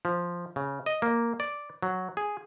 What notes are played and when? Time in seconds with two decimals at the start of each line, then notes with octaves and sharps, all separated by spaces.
0.05 F3
0.56 C#3
0.86 D#5
1.02 A#3
1.40 D5
1.83 F#3
2.17 G#4